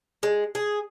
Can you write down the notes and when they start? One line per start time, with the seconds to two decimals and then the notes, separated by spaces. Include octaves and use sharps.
0.23 G#3
0.55 G#4